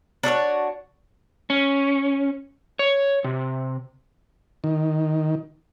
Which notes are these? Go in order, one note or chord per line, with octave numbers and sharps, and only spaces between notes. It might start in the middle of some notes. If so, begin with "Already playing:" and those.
D4 F#4 A4 C#5
C#4
C#5
C3
D#3